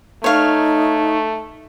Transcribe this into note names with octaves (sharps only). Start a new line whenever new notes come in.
A3 D#4 C#5 F5